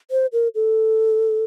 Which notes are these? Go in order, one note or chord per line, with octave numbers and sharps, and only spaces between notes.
C5
A#4
A4